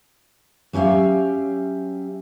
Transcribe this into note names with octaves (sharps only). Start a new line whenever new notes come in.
F#3 C#4 G4 E5 F5